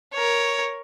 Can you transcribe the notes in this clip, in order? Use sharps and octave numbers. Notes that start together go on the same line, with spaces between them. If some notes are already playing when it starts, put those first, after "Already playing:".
A#4 C#5